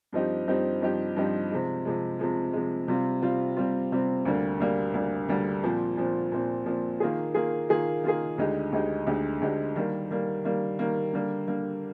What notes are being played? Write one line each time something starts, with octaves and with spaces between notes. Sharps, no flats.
G2 F3 C4 D#4 G4
G2 F3 C4 D#4 G4
G2 F3 C4 D#4 G4
G2 F3 C4 D#4 G4
C3 F3 G#3
C3 F3 G#3
C3 F3 G#3
C3 F3 G#3
C3 G3 C4 F4
C3 G3 C4 F4
C3 G3 C4 F4
C3 G3 C4 F4
D2 D3 G3 A#3
D2 D3 G3 A#3
D2 D3 G3 A#3
D2 D3 G3 A#3
A#2 F3 C4
A#2 F3 C4
A#2 F3 C4
A#2 F3 C4
D#3 A#3 F4 G#4
D#3 A#3 F4 G#4
D#3 A#3 F4 G#4
D#3 A#3 F4 G#4
D2 D3 G#3 D#4 G4
D2 D3 G#3 D#4 G4
D2 D3 G#3 D#4 G4
D2 D3 G#3 D#4 G4
D#3 G3 A#3
D#3 G3 A#3
D#3 G3 A#3
D#3 G3 A#3
D3 G3 A#3
D3 G3 A#3